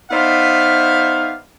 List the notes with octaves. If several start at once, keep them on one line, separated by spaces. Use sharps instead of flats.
B3 D#4 C5 D5 E5 F5